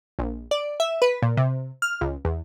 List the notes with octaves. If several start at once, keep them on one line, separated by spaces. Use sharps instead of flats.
A#1
D5
E5
B4
A#2
C3
F6
C#2
E2